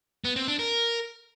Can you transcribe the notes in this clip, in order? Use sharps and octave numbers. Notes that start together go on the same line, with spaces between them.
B3
C4
D4
A#4